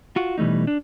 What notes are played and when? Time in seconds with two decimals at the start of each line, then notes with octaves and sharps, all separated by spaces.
0.16 F4 F#4
0.38 B2 E3 G3 A3 D#4
0.67 D4